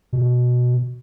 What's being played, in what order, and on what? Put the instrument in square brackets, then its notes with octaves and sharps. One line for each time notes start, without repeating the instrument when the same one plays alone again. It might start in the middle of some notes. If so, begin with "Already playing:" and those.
[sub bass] B2